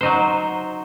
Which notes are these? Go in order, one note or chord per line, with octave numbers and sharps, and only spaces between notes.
F#3 D#4 C5